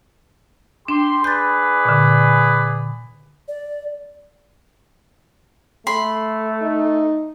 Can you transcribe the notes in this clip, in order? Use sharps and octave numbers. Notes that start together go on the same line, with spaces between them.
D4 G4 C6
G#4 B4 D5 G6 A6
A#2 D3
D5
A3 B5 C6
D#4